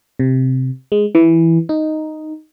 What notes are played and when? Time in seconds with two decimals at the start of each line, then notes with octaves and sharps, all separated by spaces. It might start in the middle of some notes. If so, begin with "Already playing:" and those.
0.19 C3
0.92 G#3
1.15 E3
1.69 D#4